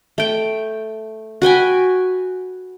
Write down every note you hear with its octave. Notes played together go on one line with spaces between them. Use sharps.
A3 G5
F#4 B4 G5 G#5